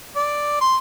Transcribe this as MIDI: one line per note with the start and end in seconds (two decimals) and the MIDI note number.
0.16 0.56 74
0.61 0.77 84